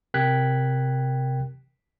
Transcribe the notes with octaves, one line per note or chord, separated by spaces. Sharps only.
C3 A#4 G5 F#6 G#6 B6